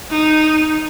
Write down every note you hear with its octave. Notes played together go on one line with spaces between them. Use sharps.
D#4